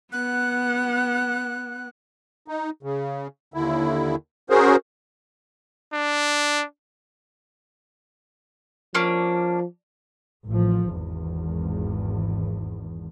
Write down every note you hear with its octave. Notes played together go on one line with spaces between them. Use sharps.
B3 F#5 F#6
D#4
C#3
D#2 D3 E4
C#4 F#4 G#4 A#4 C5
D4
F3 A#3 C#4 D4
A1 F3
G#1 E2